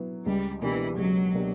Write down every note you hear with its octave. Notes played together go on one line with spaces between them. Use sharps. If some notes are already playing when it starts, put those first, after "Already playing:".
Already playing: F#3 B3 E4
C#2 G3
B2 E3 A#3 D4 G4
C#2 F#3
B2 A#3 D4 G4